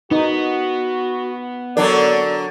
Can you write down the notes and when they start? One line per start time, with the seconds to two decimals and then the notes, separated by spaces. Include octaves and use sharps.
0.11 B3 D#4 F#4
1.77 D3 F#3 D4 A#4 D5